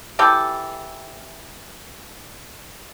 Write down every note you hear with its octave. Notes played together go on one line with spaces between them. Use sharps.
E3 G4 A4